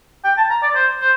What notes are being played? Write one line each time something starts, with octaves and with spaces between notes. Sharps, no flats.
G5
A5
A#5
D5
C5
C5